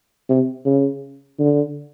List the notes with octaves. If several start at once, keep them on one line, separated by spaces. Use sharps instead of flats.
C3
C#3
D3